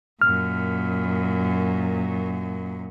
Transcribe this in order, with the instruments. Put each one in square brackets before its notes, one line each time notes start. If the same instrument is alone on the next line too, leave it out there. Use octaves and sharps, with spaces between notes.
[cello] F#2 A#2 [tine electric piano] F6